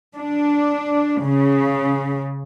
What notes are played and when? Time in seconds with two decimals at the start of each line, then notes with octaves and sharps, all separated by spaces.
0.16 D4
1.23 C#3